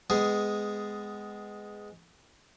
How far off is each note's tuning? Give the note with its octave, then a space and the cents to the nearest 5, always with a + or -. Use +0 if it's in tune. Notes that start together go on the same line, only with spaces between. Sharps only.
G#3 +0 B3 +25 G#4 +0